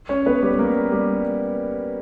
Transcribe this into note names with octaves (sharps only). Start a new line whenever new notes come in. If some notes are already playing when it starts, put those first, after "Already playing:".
C#4 C#5
B3 B4
G3 G4
A#3 A#4
G3 G4